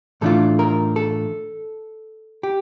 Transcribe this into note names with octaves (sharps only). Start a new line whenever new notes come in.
A2 E3 A3 D4 F4 A4
A#4
A4
G4